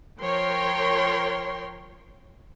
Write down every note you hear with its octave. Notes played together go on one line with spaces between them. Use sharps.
F3 A#4 C#5 G5 C6